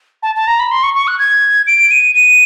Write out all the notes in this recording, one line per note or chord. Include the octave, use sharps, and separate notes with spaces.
A5
A5
A#5
B5
C6
C#6
C#6
F#6
G#6
D7
D#7
D#7